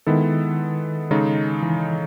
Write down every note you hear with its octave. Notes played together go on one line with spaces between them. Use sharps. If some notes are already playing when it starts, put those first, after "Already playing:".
D#3 G#3 B3 E4 A4
C#3 G#3 D#4 A4
E3